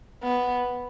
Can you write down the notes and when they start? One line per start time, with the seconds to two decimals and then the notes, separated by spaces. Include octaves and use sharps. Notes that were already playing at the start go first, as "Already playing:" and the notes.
0.23 B3